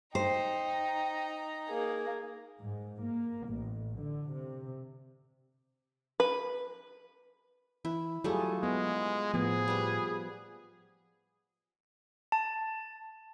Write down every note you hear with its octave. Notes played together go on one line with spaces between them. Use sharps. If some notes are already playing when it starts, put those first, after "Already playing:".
D#4 C5 G5 A#5
A#3 G#4
G#2
A#3
A1
D3
C3
B4
E3 E4
F#3 G3 A3 F4 G#4 A4
G#3 B3
A2 F3 B3 G#4
G3 B4
A5